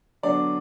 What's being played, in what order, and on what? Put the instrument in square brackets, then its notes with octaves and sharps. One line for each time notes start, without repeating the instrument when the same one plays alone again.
[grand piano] D3 F#3 B3 D4 D5